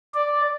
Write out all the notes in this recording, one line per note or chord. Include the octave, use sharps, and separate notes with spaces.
D5